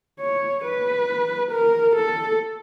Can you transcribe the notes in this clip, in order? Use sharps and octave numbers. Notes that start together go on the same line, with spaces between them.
C#5
B4
A#4
A4